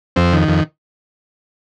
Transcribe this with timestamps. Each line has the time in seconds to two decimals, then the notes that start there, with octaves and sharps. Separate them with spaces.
0.16 F2 C4
0.33 D#3
0.48 F2